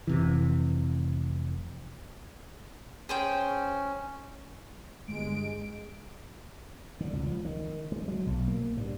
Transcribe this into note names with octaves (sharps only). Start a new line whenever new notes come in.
F1 C3 E3
C#4 G#4 C5 G5
G1 G#3 D7
D3
C#2
F3
D#3
G#3
F#3
B1
A#3
G2